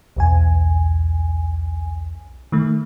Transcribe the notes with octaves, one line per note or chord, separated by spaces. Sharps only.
B1 E2 G#5
D#3 A3